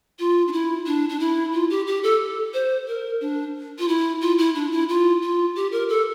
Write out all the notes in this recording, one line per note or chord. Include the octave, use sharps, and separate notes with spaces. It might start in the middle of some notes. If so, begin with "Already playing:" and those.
F4
D4
E4
D4
D4
E4
F4
G4
G4
A4
C5
A#4
D4
F4
E4
F4
E4
D4
E4
F4
F4
G4
A#4
A4